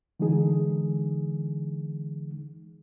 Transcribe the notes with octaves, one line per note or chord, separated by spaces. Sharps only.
D3 E3 G#3 D#4 G#4